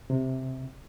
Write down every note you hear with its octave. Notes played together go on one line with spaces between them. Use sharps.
C3